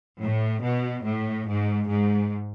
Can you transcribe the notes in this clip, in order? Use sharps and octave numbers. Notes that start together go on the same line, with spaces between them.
A2
B2
A2
G#2
G#2